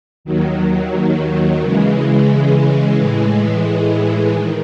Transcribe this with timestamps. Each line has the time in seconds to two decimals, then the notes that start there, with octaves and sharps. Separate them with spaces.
0.25 D#2 D#3 F#3
1.61 C#3 E3 G#3
2.97 A2 E3 G#3
4.32 D#3